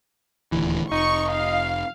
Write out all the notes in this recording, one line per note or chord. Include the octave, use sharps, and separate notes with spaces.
D#1 D2 E3
F1 D#4 C#6
F5